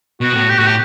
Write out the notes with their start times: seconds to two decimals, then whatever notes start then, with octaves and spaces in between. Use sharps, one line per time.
0.21 B2 F#4
0.34 A2
0.49 G4
0.58 A2 F#4
0.66 G4